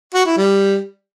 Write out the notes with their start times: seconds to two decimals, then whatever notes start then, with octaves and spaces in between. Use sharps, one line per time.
0.14 F#4
0.25 E4
0.37 G3